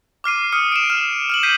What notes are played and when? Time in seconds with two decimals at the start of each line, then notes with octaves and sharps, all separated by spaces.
0.24 D6 F6 C7 D#7
0.52 D#6 F6 C#7
0.72 D7 E7
0.90 F6
1.30 F6 E7 F#7
1.43 G6 B6 C7 D#7